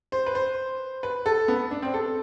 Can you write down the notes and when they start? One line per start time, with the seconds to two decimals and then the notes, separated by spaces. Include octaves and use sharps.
0.12 C5
0.26 B4
0.35 C5
1.03 B4
1.26 A4
1.48 B3
1.71 D4
1.82 C4
1.94 A4